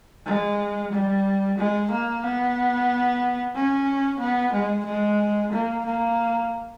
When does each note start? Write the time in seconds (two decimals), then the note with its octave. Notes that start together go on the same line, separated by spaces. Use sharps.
0.26 G#3
0.92 G3
1.58 G#3
1.91 A#3
2.24 B3
3.55 C#4
4.20 B3
4.53 G#3
4.86 G#3
5.52 A#3
5.85 A#3